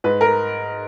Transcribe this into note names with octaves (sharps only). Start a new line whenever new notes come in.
G#2 B4
A#4